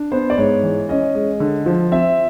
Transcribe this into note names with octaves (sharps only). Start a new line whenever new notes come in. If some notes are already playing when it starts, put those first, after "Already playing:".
Already playing: D4
B3 C5
D5
G#2 C#5
E3
C#4 D#5
G#3
D3
F3
C4 E5